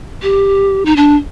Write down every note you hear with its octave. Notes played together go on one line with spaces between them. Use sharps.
G4
D#4
D4